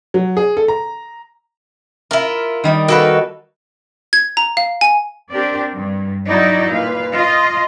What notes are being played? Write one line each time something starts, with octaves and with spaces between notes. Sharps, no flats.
F#3
G#4
A4
A#5
E4 F4 A#4
D#3 G3 D#4
A#3 F#4 A4 B4
G#6
A#5
F5
G#5
C4 D4 G4 A#4 D5
G2
F#3 D#4 E4 F#4 D5
A#2 B4 F5
F4 D#5